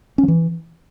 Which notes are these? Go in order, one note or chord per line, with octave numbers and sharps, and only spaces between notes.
C#4
F3
E3